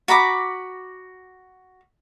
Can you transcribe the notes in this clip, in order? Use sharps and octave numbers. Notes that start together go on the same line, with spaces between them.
F#4 A#5 B5 D6